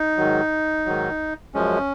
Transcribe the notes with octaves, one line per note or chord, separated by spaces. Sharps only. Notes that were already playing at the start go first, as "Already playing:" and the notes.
Already playing: D#4
G#2 D#3 F#3
G#2 D#3 F#3
F#2 F3 G#3 C#4